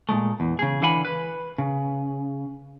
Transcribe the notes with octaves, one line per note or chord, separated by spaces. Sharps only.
A#2 E3 G#3 A3
E2
C#3 G#4
D3 E3 F5 F#5 G#5 B5
B4
C#3